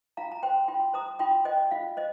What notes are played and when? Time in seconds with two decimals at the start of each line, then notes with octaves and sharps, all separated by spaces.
0.17 F4 F5 A#5
0.32 A#5
0.43 C5 G5 C6
0.68 F4 G5 C6
0.94 C5 A#5 D#6
1.19 F4 G5 C6
1.45 C5 D#5 G5
1.71 F4 F5
1.97 C5 D#5